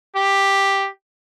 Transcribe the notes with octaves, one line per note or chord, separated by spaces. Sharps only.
G4